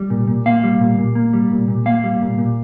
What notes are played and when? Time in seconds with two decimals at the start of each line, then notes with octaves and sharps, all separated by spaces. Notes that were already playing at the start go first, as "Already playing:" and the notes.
Already playing: G3
0.10 A#2
0.28 A#2
0.46 A#3 F5
0.63 G3
0.81 A#2
0.98 A#2
1.15 A#3
1.33 G3
1.52 A#2
1.68 A#2
1.86 A#3 F5
2.04 G3
2.22 A#2
2.38 A#2